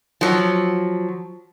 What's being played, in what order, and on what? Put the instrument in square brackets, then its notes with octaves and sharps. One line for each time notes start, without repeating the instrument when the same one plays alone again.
[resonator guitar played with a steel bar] F3 F#3